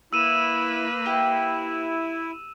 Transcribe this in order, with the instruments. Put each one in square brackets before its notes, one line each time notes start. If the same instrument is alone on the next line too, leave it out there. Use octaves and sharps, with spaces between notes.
[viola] A#3 B4 [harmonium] E4 [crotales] E6 D#7 E7
[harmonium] E4 [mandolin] G4